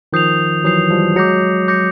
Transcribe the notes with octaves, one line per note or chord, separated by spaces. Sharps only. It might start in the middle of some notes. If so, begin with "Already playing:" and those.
D#3 F3 D#6 G6 C7 F7
E3 F#3 D#6 G6 C7 F7
F3 G3
F#3 G#3 D6 G6 A#6 C#7
D6 G6 A#6 C#7